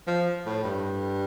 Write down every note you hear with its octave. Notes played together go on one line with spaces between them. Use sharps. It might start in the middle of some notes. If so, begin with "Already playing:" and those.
F3
A2
G2